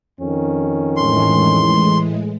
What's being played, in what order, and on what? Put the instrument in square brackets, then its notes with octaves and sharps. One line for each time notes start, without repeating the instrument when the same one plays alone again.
[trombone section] F2 D#3 C#4
[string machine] A2 E3 G#3 [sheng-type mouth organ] C6